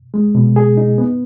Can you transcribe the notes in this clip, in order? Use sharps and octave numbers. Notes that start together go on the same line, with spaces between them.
G#3
B2
G#4
D#4
B3